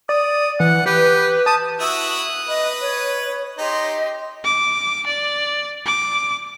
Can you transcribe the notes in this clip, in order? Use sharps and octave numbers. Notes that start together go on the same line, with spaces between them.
D5 D#6
E3 F#5
G4 B4
A5 D#6
E4 F#4 E5 D#6 F#6
B4 D#5
C#5
D#4 G4 D#5 C6
D6
D5
D6